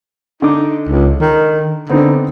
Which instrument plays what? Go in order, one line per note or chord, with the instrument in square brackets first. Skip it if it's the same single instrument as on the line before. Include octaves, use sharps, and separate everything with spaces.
[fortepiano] D3 D6 [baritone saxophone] D#4
[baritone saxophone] C#2
D#3
[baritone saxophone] D3 [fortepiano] B3 C4 D#4